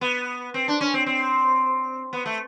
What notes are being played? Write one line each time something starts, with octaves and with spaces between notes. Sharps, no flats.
B3
C4
D4
C#4
C4
C4
B3
A3